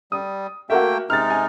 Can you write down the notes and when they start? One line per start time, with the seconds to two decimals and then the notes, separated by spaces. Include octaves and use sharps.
0.12 G3 D#6
0.70 A3 A#3 F#4 A#4 E5 G5
1.10 C3 G#3 D#4 F6 A6
1.30 G#5